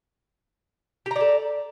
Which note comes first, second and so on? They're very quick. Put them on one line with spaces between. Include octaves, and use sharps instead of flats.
G4 A#5 D5 A4